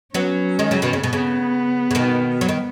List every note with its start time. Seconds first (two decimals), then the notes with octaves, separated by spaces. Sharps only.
0.14 F#3 B3 C#4
0.59 D#3 G#3
0.71 C#3 F#3
0.82 B2 D#3
0.93 C#3
1.03 B2 B3
1.13 C#3
1.91 C#3
1.95 B2 D#3
2.41 F#3
2.49 D#3